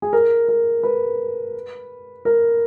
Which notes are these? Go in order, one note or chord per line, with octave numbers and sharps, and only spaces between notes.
G#4
A#4
A#4
B4
A#4